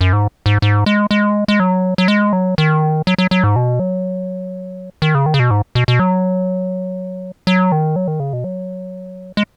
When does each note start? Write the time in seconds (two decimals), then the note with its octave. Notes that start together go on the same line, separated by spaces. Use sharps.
0.01 F#2
0.13 G#2
0.46 G#2
0.62 G#2
0.86 G#3
1.11 G#3
1.48 G#3
1.60 F#3
1.98 F#3
2.08 G#3
2.33 F#3
2.58 D#3
3.07 F#3
3.18 F#3
3.31 F#3
3.44 G#2
3.56 B2
3.80 F#3
5.02 D#3
5.15 C#3
5.26 D#3
5.34 C#3
5.39 B2
5.51 G#2
5.75 B2
5.88 B2
6.00 F#3
7.47 F#3
7.72 D#3
7.96 F#3
8.08 D#3
8.20 C#3
8.33 B2
8.44 F#3
9.37 G#3